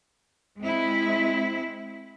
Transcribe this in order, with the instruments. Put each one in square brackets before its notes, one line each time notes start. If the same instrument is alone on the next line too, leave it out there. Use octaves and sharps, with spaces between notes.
[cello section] G#3 C4 E4